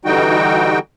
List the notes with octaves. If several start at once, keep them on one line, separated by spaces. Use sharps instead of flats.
D3 E3 G3 D#4 F#4 G5